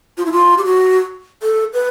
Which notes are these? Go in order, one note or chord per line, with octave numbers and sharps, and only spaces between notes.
F4
E4
F4
G4
F#4
A4
B4